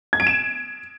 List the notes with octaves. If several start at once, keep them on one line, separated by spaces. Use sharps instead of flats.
G#6
D7
E7